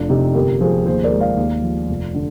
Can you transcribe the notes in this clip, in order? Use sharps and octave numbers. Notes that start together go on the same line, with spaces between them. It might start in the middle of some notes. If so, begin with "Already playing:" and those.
Already playing: F1 D4 F4
C3 D#4 G4
G1 G4 A#4
F3 G#4 C5
D#2 G#4 C5
A#4 D5
G#3
D5 F5
D#2
F3
F1
D3